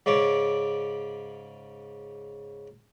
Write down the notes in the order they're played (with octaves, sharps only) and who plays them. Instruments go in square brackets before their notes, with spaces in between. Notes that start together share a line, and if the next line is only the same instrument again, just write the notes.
[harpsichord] G#2 C#3 C#4 D5 D6